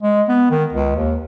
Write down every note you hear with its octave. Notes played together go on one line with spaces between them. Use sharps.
G#3
B3
D#3
C#2
D#2